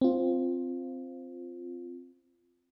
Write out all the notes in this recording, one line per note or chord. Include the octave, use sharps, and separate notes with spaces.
C4 F4